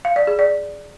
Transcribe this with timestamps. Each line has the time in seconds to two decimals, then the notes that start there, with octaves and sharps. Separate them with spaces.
0.05 F5
0.16 D5
0.27 G#4
0.39 D5